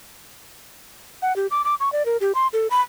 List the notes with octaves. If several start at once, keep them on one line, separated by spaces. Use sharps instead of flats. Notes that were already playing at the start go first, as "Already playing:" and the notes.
F#5
G4
D6
D6
C#6
D5
A#4
G4
C6
A4
B5